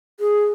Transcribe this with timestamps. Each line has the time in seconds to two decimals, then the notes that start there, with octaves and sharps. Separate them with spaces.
0.20 G#4